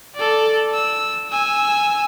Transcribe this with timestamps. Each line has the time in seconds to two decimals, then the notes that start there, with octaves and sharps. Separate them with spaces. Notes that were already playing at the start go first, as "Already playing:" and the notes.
0.16 A4 D5
0.74 E6
1.30 G#5 E6